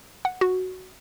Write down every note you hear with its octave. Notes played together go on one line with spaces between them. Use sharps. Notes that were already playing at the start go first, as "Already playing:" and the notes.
F#5
F#4